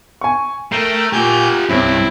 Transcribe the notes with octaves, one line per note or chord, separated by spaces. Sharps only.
G#5 C#6
A3 A#4 G5 C7 D#7 E7
A#2 F4 G4 G#5 G6
C2 G2 C4 C#4 E4